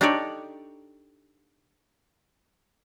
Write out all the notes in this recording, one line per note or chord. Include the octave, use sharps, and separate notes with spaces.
D4 D#4 G4 A4 C#5 D5